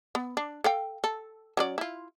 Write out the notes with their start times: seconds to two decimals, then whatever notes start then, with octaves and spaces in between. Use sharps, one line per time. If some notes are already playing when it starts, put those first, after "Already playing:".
0.15 B3
0.37 D4
0.64 A4 F5 G5
1.04 A4
1.57 F#3 C#4 D5
1.78 E4 F4